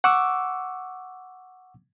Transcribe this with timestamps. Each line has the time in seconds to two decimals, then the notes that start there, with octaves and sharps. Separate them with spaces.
0.04 F#5 C#6 D6 E6